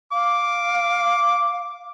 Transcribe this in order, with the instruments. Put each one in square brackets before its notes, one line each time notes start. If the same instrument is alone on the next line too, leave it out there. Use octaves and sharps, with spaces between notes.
[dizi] F5 [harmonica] D6